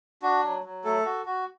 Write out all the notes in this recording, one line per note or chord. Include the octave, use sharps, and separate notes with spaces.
D4 F#4
F#3
F#3
A3 A4
F#4
F#4